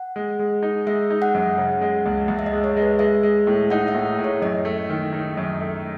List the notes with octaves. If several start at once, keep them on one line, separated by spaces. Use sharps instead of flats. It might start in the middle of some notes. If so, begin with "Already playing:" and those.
Already playing: F#5
G#3
G#3
D#4
G#3 E5
D#4
F#5
F#2
C#3
G#3
C#2
C#2 E5
E5
D#5
G#3
C#5
G#3
B4
G#3 E5
G#3
A2
D#4 F#5
E5
A2
A2
C#5
F#2 D#5
A3
D#3
D#4
F#2
A3